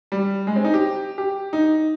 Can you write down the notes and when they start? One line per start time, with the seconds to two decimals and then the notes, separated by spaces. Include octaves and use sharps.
0.12 G3
0.47 G#3
0.56 C4
0.65 D#4
0.74 G4
1.18 G4
1.53 D#4